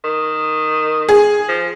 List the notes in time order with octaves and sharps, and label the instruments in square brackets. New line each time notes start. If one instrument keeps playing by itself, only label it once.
[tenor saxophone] D#3
[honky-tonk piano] G#4
[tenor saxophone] F3